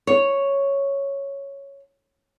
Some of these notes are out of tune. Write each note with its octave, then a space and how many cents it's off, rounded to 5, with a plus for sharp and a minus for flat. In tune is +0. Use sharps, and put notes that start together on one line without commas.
C#5 +0